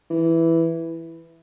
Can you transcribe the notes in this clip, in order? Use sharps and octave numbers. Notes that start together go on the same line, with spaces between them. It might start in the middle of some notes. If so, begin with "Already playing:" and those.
E3